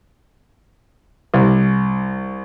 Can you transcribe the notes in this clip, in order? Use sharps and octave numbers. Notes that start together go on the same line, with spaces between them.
C2